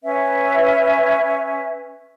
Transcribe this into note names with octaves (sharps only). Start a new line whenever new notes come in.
C#4 B4 E5